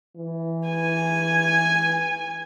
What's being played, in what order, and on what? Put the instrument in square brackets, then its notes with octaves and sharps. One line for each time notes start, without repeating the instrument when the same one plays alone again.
[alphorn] E3
[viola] G#5